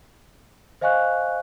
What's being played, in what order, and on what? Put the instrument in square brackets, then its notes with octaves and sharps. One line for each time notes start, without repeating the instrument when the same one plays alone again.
[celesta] C5 D#5 F5 G#5 C#6 F#6